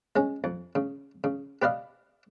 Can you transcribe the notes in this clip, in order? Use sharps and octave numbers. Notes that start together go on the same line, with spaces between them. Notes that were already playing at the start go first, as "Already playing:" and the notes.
G#3 C#4
F2
C#3
C#3
G4 B4 D5 D#5 F5